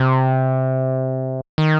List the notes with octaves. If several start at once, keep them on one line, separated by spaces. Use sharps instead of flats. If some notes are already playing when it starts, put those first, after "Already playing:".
Already playing: C3
D#3